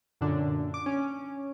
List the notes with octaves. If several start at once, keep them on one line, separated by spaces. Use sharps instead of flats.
F#2 A#2 D3 D4
D6
C#4